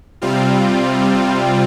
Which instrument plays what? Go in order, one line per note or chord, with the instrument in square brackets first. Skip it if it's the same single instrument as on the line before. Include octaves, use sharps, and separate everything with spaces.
[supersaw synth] C3 G3 C4 F4